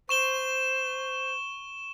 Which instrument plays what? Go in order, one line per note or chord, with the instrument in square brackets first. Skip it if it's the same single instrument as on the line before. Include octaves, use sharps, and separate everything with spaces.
[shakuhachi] C5 [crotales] C#6 E7 G7